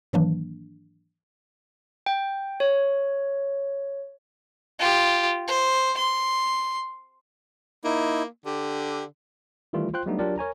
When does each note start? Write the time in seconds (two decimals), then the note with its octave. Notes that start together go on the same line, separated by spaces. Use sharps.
0.13 G#2 D#3 E3 F#3 A#3 D4
2.06 G5
2.60 C#5
4.79 F4 G4
5.48 C5
5.98 C6
7.84 A#3 D#4 E4
8.46 D3 G4
9.73 D#3 E3 G3 A3 F4
9.94 F4 C5 G5 C6 F#6
10.06 F#3 G3 A3 B3 D4 D#4
10.19 F#3 D4 F4 G4 A#4 D5
10.38 A#4 C#5 G#5 A#5